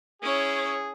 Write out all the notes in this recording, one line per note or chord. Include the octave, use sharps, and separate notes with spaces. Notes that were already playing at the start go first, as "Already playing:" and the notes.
C#4 E4 G#4 C#5